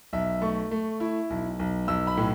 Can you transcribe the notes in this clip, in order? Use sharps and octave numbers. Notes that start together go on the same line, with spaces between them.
B1 E5
A3 C#6
A3
E4
B1
B1
B1 E6
B5
A2